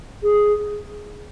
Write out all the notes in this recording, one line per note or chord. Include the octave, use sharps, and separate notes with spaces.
G#4